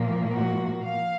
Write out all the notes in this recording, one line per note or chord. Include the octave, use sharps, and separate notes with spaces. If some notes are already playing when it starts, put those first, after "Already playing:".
Already playing: A#2 F3 A#3
F#4
F5